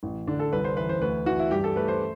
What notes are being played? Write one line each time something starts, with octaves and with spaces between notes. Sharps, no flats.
A1
D3 D4
A4
C2 B4
C5
E3 B4
C5
D2 B4
E3 F#4
E4
G2 G4
A4
A3 B4
C5